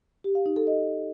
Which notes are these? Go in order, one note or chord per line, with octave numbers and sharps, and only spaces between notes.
G4
F5
D#4
A4
D#5